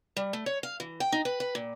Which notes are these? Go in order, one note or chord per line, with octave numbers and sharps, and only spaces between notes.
G3
A3
C#5
F5
E3
G5
D#4
B4
B4
A#2